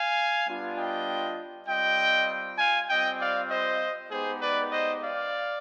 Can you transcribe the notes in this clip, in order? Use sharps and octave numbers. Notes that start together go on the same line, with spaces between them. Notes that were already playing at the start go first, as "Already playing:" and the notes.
Already playing: F5 G#5
G3 B3 D4 F4
D#5 G5
G3 C4 F4 D#5 G5
F5 G#5
G3 C4 F4 D#5 G5
D5 F5
C5 D#5
G#3 B3 D#4 G4 G#4 C5
B4 D5
C5 D#5
D5 F5